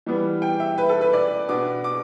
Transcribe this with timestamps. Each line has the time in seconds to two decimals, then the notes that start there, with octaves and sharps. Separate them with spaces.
0.06 E3 G3 B3
0.42 G5
0.60 E5
0.78 B4
0.89 A4
1.01 B4
1.13 D5
1.49 B2 B3 D4 D6
1.84 D6